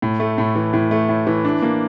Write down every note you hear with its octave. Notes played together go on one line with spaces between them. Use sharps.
A2
A3
A2
E3
A2
A3
A2
E3
D4
A#3